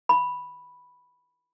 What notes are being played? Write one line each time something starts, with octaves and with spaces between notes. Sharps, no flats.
B5